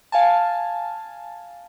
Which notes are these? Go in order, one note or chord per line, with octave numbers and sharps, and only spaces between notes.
F5 G#5 A5